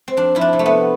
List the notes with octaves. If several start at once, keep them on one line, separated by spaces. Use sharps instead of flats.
C4
F2 D4
F3 E4
D4
C3
A3
B3